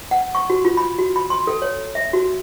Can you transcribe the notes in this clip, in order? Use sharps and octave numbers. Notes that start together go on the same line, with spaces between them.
F#5
C#6
F#4
F4
B5
F#4
B5
C6
A4
C#5
E5
F#4